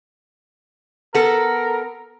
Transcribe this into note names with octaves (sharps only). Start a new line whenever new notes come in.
B3 A4 A#4